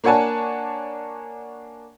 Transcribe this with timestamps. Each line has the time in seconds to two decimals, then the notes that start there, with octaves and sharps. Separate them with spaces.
0.04 A#3 D4 C#5 F#5 G#5 A5